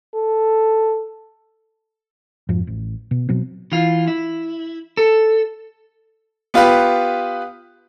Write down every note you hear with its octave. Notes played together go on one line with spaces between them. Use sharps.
A4
F2 G#2 F3
A1
B2
B2 F#3 C4
E3 F4
E4
A4
B3 F4 G4 B4